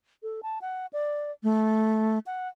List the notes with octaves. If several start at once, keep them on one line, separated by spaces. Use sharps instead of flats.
A4
A5
F#5
D5
A3
F#5